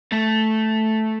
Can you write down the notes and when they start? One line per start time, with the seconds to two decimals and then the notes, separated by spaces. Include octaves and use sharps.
0.12 A3